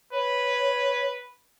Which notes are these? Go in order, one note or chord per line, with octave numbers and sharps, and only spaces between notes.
B4 C#5